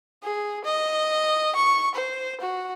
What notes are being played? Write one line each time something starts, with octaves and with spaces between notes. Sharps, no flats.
G#4
D#5
C#6
C5
F#4